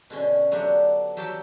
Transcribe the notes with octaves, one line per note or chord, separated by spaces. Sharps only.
B2 D3 C#4
F#3 A3 B3 D4 G4
F#3 G4 A4 G5 A5 B5